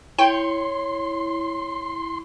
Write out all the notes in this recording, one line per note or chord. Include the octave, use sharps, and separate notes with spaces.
E4 C#5 G5 C6